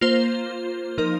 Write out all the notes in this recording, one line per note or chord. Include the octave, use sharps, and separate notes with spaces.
A#3 F4 C5
F3 D#4 A#4